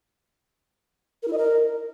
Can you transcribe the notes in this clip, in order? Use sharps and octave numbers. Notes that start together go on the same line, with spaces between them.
A#4
E4
D#5
A#4